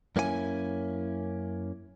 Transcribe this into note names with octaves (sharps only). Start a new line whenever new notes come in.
F#2 A#3 C#4 E4 G4 G#5